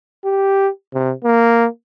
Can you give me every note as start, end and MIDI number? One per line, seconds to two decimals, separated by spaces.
0.24 0.68 67
0.94 1.12 48
1.24 1.66 58